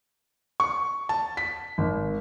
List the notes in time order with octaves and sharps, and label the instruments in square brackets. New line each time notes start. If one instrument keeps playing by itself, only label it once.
[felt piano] C#6
A5
B6
G#1